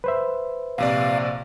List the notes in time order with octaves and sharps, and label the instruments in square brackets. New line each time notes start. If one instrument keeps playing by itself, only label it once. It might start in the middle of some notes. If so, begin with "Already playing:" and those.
[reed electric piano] B4 C5 E5
[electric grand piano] A#1 C3 D5 [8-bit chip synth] F5